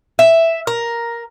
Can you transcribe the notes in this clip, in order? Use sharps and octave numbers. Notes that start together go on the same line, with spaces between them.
E5
A#4